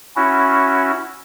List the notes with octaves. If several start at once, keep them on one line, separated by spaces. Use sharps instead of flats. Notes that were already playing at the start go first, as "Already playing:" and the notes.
C#4 E4 F#4